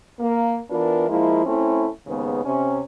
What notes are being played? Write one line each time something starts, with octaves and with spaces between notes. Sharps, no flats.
A#3
E3 B3 D4 F4 A#4
F3 G#3 A#3 E4
A3 C4 C#4 E4
D#2 G#2 C#3 B3
C3 C#4